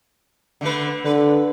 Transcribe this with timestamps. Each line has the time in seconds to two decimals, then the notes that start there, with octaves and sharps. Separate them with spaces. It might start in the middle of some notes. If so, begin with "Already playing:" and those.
0.61 D3 A3 B4
1.05 D3 B4